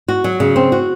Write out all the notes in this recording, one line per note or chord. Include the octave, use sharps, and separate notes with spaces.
F#4
F#3
C#3
C4
F#4